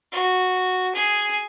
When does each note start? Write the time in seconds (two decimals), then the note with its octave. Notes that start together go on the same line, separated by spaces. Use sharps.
0.12 F#4
0.95 G#4